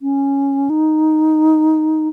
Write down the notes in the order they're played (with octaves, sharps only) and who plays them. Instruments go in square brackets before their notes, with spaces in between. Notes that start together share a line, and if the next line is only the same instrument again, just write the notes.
[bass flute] C#4
D#4